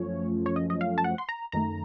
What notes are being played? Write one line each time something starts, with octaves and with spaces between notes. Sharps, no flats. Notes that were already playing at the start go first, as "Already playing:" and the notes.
Already playing: F#2 F3 A3 C#4 C#5
C#5
D#5
D#5
F5
A5
F#5
C6
A#5
F#2 D#3 A3 A#5